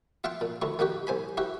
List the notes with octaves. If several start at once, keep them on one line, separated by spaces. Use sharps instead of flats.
F4 E5 F#5 G5 C6
A#2
D2 E4 C#6
D#3 A#3 F#4 G4
C2 C5 G#5 B5
E4 F#4 G4